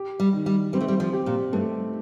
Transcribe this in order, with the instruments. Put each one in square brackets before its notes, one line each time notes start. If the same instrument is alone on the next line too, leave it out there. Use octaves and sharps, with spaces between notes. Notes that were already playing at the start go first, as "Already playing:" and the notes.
Already playing: [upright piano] G4
[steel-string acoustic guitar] G3
[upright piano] D#3
[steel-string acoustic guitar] G3
[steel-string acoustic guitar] G3 [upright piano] C4
[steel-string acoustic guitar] A3
G3
F3
[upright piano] G4
[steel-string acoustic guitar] A#2
[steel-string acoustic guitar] G2 [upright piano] A3